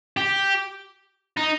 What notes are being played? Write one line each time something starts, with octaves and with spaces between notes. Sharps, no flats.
G4
D#4